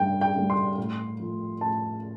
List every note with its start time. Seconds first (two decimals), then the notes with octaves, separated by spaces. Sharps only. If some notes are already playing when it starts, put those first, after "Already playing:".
Already playing: G2 D3 G3 G5
0.21 G5
0.36 D3 G3
0.50 C6
0.78 A2
1.19 F3 A3
1.61 A2 A5